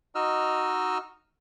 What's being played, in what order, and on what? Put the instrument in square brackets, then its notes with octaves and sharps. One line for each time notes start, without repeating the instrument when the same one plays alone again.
[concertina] D#4 F#4 D#5 E6 F6